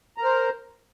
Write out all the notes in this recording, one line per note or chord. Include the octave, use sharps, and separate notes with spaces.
A#4 C5 A#5